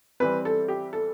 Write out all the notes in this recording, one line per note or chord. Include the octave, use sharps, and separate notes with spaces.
E3 G3 C4 B4
A4
G4
A4